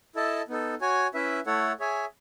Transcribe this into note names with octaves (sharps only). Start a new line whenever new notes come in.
E4 A4 D#5 A5
B3 D#4 A4
F#4 C#5 G#5
C#4 E4 B4 E5
A3 E4 A4 C#5 F#5
G#4 C#5 E5 G#5